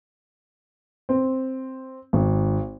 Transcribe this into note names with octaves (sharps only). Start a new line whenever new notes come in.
C4
G#1